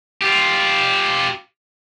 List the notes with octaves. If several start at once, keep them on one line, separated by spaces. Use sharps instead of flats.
F4 G4